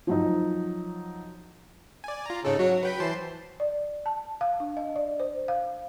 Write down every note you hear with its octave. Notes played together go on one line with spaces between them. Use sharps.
F3 F#3 D#4
D5 G#5
F4 A#5
G#2 C#3 D#4 A4
F#3 F#4
F#3 B4 G5 B5
E3 C5 A5 C6
D5
A5
F5
D4
D#5
D5
C5
F5